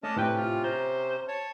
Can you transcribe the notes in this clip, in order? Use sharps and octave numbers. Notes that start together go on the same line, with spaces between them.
A3 C#4 D4 D#5 A5
A2 C3 C#4 D4 B4 G5
F4
C5 A#5 G6
C#5 A5